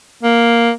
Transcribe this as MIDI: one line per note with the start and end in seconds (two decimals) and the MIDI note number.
0.23 0.72 58